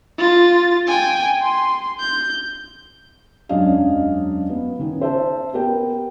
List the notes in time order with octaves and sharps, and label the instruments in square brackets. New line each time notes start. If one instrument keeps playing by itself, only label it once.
[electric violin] F4 A6
G5 G#5
C6
G6
[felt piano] E1 F#2 C#4 D4 D#5 F5
B3
D#3 C#4 D#4
C5 E5 A5
B3 G4 A#4 G5